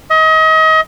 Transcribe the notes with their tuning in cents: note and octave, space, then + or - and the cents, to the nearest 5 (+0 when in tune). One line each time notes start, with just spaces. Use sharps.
D#5 +35